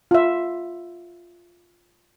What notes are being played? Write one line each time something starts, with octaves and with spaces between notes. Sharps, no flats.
F4 E5